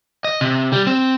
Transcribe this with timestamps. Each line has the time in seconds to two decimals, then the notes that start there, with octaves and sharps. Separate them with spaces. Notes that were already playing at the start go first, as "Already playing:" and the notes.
0.25 D#5
0.41 C3
0.72 G3
0.87 C4